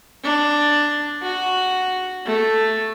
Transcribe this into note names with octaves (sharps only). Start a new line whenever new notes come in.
D4
F#4
A3